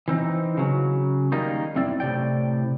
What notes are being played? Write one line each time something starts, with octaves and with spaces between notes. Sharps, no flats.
E3 C4 D#4
C#3 F#3
D#3 G3 A#3 D#4
F#2 C4 E4 D5
A2 C3 D5 G5